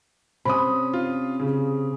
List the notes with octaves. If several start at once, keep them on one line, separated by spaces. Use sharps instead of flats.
C3 C#4 B5 D#6
F4
C#3